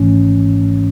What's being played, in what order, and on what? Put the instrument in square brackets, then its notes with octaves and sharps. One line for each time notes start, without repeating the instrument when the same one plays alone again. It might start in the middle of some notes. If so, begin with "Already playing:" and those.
Already playing: [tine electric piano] G#1 G#2 E3 A3 C#4